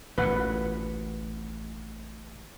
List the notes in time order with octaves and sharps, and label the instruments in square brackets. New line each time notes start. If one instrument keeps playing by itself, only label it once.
[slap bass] A1 D2 A#2 [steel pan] B4 F#5